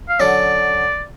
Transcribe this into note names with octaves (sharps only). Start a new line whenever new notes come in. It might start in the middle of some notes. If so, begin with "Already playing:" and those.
F5
D3 F#3 C#4 D5